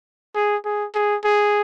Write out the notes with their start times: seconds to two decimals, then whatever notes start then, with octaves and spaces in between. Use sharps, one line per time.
0.35 G#4
0.65 G#4
0.95 G#4
1.24 G#4